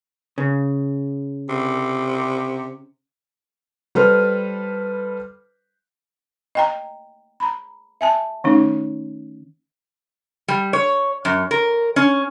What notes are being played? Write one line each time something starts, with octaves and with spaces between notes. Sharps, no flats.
C#3
C3
G3 A4 B4 C5 F6
D#5 G5 A#5
A#5 B5
E5 G#5 A5
D#3 A3 C#4 D#4
G3
C#5
F#2
A#4
C#4